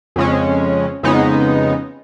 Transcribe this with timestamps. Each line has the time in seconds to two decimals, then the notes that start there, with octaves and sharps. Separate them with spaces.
0.16 F2 C#3 G#3 C#4
1.03 F2 C#3 G#3 B3 D#4